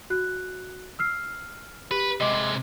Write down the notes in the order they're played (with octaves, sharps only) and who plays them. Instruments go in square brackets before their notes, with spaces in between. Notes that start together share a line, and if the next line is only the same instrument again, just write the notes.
[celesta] F#4 F#6
E6 F6 C7
[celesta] G4 [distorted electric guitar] B4
[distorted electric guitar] C3 G#3 [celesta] D#5 D6